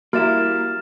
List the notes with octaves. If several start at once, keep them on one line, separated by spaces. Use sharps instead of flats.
G3 A#3 E4 F#4 E5 F6 A6 E7